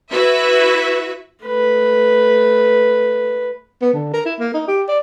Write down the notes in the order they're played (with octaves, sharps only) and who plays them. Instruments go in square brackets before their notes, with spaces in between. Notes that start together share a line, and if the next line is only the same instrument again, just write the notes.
[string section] E4 F#4 B4 E5
[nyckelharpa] A3 B4
[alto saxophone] B3
D3
A#4
E4
A#3
D#4
G4
D5